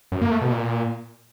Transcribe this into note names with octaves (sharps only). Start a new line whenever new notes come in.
F#2
A#3
A3
B2
A#2